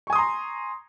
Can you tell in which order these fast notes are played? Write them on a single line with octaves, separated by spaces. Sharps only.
C#6 G#5 D#6 C6 A#5